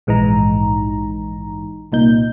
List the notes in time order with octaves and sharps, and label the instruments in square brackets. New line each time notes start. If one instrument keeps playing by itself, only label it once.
[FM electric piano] A#1 G#2 E3 D#4 A#5
C2 A#2 D#4 G6